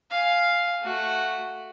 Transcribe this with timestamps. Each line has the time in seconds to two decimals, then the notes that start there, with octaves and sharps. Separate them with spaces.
0.11 F5 G#5
0.82 A3 F#4